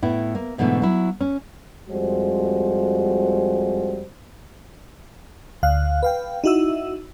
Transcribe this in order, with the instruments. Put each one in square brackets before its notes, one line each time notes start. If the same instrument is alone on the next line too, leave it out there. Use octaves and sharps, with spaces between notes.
[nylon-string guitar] A2 B3 E4
A#3
G#2 B2 D3 E3 A3
F#3 E4
C#4
[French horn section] F2 G3 G#3 F#4 C5
[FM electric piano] D2 F5 F#6
B4 F5 G5
D#4 E4 F#4 E5 E6